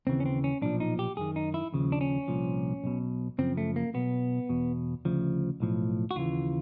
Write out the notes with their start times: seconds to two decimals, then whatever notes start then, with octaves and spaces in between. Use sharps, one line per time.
0.07 D#2 C#3 E3 C4
0.20 C#4
0.26 C4
0.44 C#4
0.62 B1 A#2 F3 D4
0.80 D#4
0.99 G4
1.17 F#2 D#3 G#4
1.36 D#4
1.54 E4
1.73 D#2 C#3 F3
1.92 D4
2.01 C#4
2.28 C2 A#2 F3
2.84 B1 B2
3.38 F#2 C#3 F3 C4
3.57 A3
3.76 A#3
3.94 B1 B2 B3
4.49 E2 B2
5.05 D2 C#3 F3
5.60 B1 A2 F3
6.11 F#4
6.16 D#2 C#3 E3 F4